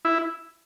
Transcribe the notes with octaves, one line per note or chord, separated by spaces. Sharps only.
E4